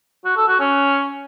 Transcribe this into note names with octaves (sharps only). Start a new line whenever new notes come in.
F#4
A4
F#4
C#4